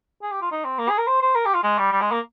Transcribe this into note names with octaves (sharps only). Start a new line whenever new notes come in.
G#4
G4
F4
D#4
C4
A#3
G#4
A#4
C5
C5
A#4
G4
F4
G#3
G3
G3
G#3
A#3